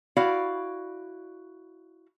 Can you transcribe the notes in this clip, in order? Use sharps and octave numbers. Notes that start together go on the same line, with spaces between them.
E4 F#4 D5 F5